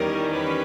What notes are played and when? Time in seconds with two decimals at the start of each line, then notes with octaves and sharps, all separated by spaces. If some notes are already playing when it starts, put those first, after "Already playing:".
Already playing: E2 D#3 G3 C#4 A#4
0.33 B4